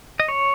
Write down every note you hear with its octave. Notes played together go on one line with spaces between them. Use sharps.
D#5
C#5